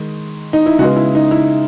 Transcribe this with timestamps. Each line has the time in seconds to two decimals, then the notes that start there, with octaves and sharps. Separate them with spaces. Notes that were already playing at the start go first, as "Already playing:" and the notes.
Already playing: D#3 G#3
0.53 D#4
0.66 E4
0.79 C#3 F#4
0.82 G#3 B3
0.96 E4
1.15 D#4
1.31 E4